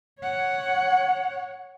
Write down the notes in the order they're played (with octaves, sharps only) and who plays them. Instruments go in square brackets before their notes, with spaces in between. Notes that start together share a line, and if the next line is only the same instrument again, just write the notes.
[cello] C#5 F#5